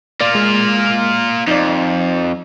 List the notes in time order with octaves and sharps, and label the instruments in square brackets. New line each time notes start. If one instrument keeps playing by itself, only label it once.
[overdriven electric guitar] A#3 F4 [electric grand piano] D5
[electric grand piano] G#3
[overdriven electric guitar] F2 [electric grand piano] D#4 D5